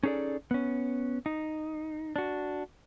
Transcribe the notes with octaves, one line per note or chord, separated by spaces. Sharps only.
C#4 D#4 G#4 A4 D5
B3 C#4
D#4
D4 F#4